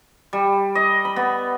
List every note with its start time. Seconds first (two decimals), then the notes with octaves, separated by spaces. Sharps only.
0.33 G3
0.75 D#5
1.05 B5
1.16 B3